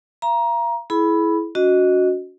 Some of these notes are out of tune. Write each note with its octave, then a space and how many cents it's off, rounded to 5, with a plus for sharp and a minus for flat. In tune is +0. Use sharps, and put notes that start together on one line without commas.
F5 -40 A#5 +20
E4 +0 G#4 +35 B5 +0
C#4 +45 F#4 -10 D#5 +0